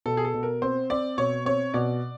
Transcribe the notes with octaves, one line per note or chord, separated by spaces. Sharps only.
B2 A4
G#4
A4
B2
A#4
C4 C5
C4 D5
B2 C#5
C4 C#5
B2 D5